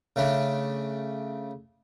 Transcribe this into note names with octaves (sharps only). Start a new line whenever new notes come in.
C#3 A3 D4